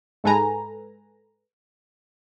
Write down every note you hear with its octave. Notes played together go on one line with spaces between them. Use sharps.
G#2 G#3 A4 B4 G#5 A#5